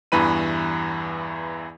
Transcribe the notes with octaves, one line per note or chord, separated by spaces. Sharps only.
E2 G2 E3 B4 B5 D#7